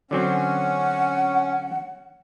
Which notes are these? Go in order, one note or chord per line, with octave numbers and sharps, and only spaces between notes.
D3 F#3 C4 C#4 F#5